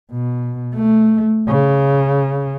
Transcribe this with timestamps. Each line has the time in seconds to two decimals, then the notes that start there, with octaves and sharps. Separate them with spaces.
0.12 B2
0.75 A3
1.48 C#3